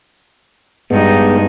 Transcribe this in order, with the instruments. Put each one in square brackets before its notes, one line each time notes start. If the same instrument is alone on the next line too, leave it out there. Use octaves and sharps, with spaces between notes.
[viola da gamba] G2 D#4 [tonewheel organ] G#3 B3